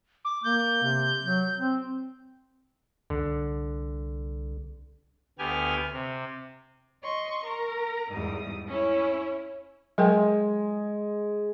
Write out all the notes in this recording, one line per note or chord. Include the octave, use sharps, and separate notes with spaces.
D6
A#3 G6
C3
F#3
C4
C2 D3
D2 B3 G4 G#5 F6
C3
D#5 C6 C#6
A#4 A#5
E2 G#2 G3 D#6
C#4 E4 C#5
F#3 G#3 A#4 G5